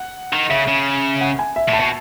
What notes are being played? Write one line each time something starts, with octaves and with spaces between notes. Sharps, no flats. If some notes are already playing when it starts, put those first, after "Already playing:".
Already playing: F#5
D#3
C#3 E5
C#3
F#5
G#5
E5
A2
A5
B2